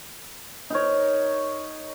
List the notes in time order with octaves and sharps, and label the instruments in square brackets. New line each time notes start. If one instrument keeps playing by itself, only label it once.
[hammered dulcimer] D#4 A#4 C#5